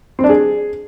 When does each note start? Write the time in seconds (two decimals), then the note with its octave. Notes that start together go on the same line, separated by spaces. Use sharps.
0.19 C4
0.24 D4
0.29 G#4